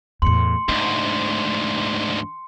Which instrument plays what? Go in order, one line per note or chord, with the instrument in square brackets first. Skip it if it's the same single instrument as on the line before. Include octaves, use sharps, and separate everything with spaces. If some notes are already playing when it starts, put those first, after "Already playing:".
[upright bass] E2 A2 [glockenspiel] C6 C#7
[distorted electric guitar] D2 G#2 [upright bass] D4